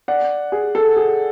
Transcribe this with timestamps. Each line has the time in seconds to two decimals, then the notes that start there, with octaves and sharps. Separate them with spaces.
0.08 D5 F#5
0.52 G#4
0.75 A4
0.96 G#4